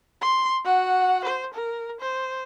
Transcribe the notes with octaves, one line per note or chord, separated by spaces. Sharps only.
C6
F#4 F#5
C5
A#4
C5